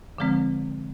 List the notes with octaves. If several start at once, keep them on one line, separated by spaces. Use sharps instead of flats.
D3 F3 G#3 C4